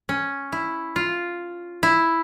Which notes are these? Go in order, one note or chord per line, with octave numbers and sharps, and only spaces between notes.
C#4
E4
F4
E4